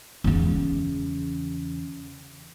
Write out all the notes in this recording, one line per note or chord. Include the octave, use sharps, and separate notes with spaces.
E2 C#3